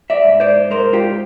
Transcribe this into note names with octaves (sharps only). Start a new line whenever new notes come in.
D5 E5
G#2
C5 D5
G#3 A#4 C5
F4 G4